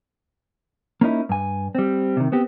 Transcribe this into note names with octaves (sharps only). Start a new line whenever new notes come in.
A#3 C#4 D#4 E4
G2 G#5
G3 C4
C3 D#3
B3 C4 G4